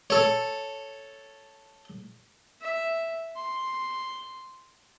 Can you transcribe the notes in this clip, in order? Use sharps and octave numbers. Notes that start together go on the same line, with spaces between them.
A4 C#5
E5
C6